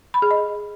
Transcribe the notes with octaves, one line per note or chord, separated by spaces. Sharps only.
B5
G#4
D#5